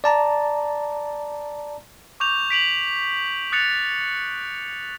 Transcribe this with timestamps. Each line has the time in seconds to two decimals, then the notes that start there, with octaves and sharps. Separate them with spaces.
0.04 D5 A5 A#5
2.20 C#6 D6 G6 F7
2.50 B6 D7 F7 F#7
3.52 D#6 F#6 A6 C#7 F7